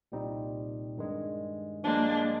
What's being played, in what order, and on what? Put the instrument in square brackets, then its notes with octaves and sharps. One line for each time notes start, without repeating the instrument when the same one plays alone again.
[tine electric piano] C2 A#2 G3 C4 D#4
G2 D#3 G#3
[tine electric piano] G2 F3 G#3 [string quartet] A#3 D4